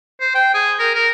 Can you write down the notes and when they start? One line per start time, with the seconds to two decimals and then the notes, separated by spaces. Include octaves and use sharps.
0.20 C5
0.35 G5
0.54 G#4
0.79 A#4
0.95 A#4